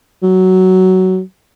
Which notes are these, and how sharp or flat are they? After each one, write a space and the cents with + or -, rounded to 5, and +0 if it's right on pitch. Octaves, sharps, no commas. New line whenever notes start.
F#3 +10